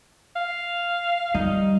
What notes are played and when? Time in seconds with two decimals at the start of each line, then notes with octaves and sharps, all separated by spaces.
0.36 F5
1.34 G3 D#4